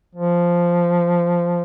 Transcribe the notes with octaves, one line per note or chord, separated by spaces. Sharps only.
F3